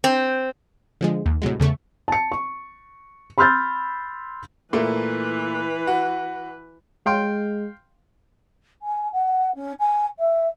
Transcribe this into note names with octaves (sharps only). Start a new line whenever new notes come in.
C4
D3 F3 G#3
D#2
A2 C3 F#3 G#3
E2 C#3 A3 C#6
A5 C#7
C#6
B5 C6 E6 F6 G6 A6
A#2 E3 A3 A#3 B4
F#4
G#3 F5 G5 C6
G#5
F#5
C#4
G#5
E5